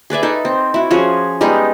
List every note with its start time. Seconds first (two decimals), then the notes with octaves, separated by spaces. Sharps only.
0.10 G#4 B4 D5 E5
0.23 D#4 A4
0.45 C4
0.74 E4 F#4
0.91 F3 C#4 F#4 G#4
1.41 G3 G#3 B3 D#4